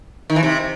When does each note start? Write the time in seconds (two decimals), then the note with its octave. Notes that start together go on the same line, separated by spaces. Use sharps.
0.30 D#3
0.36 E3
0.43 C3